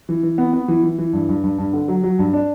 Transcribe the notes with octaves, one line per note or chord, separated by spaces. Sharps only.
E3
E3
B3
B3
E3
E3
E3
G2
G2
G2
G2
D3
F#3
F#3
G2
D4